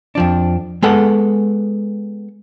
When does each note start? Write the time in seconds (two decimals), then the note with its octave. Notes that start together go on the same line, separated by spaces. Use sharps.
0.15 F2 F3 D4
0.82 G#3 B3 A4 F#5